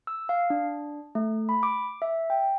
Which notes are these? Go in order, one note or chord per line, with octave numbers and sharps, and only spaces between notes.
E6
F5
D4
A3
B5
D6
E5
G5